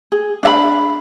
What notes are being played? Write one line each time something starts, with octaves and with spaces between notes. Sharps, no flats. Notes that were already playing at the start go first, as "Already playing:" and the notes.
G#4
D4 E5 B5